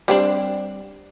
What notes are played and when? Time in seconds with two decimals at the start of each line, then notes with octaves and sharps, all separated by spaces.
0.08 G3 C4 D4